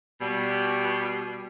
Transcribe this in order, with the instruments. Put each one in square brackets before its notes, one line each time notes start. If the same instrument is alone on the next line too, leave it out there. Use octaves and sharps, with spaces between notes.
[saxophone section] B2 G3